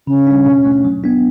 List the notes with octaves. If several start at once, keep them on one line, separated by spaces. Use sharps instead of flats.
C#3 C#4
G3 D4
B2
A3 D4
F#3
B3 D4